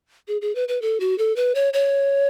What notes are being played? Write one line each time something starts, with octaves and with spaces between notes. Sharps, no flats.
G#4
G#4
B4
B4
A4
F#4
A4
B4
C#5
C#5